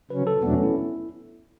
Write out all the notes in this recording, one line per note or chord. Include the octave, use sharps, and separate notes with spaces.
C#3 F#3 C#4 B4
A4
E2 B2 F#3 A3 B3 D4
C#4
E4